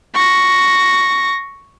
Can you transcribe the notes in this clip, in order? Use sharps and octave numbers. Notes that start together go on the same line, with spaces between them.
C#6 A#6